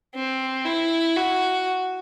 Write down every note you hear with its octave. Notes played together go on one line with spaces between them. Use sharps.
C4
E4
F#4